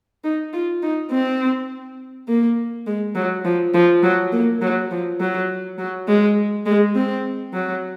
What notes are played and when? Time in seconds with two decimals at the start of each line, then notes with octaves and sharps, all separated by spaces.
0.24 D#4
0.53 F4
0.83 D#4
1.11 C4
2.28 A#3
2.87 G#3
3.15 F#3
3.45 F3
3.74 F3
4.03 F#3
4.32 A#3
4.61 F#3
4.91 F3
5.20 F#3
5.78 F#3
6.08 G#3
6.66 G#3
6.95 C4
7.54 F#3